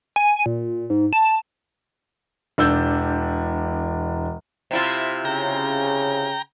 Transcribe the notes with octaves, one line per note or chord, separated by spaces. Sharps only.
G#5
A#2
G#2
A5
E1 D4 E6 G6
C3 E4 F4
C#3 G5 A#5